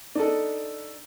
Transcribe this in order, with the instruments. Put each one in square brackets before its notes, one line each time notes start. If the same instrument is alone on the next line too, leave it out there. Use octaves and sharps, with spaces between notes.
[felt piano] D4 D#4 A4